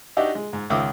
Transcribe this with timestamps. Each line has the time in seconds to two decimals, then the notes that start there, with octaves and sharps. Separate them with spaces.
0.17 D4 D#4 F#4 G4 D#5 E5
0.35 G#3
0.53 G#2
0.70 C#2 D#3 E5 D6 D#6